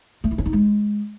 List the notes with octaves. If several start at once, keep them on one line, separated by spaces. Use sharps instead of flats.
A3
E4
C#4
D#4
G#3